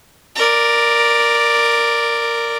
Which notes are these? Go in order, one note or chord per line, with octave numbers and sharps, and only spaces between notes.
A#4 D5